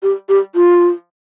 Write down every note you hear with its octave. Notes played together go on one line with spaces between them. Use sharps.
G4
G4
F4